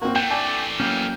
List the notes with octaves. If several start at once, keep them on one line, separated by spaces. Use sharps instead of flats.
A#3 C4 F#4
E3 A3 F#5 G5 G6
D4 A4 D5 G#5
F#3 A#3 C#4 G5 F6